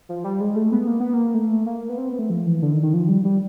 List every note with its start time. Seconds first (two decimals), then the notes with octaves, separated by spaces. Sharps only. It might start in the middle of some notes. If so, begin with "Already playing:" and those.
0.09 F3
0.24 G3
0.41 G#3
0.56 A3
0.72 B3
0.87 A#3
1.00 B3
1.13 A#3
1.34 A3
1.66 A#3
1.89 B3
1.98 C4
2.09 B3
2.19 A3
2.30 F3
2.46 E3
2.62 D3
2.72 D#3
2.83 D#3
2.94 F3
3.09 G3
3.24 G3